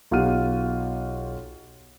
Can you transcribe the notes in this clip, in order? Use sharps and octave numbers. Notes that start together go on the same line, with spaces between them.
B1 F4 G4 F#5 F6 D#7